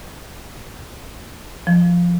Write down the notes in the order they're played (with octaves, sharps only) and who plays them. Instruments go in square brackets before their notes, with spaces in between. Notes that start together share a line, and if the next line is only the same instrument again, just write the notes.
[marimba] F3